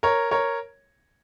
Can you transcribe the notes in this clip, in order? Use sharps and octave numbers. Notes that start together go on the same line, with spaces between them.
A#4 C#5
A#4 C#5